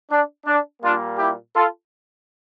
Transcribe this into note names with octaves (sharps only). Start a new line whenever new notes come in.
D4
D4
A#2 G3 A#3 D4 F4
E4 G4
F4 A4